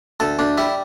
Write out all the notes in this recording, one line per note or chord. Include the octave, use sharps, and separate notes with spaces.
D2 A4
D2 D4
G3 E4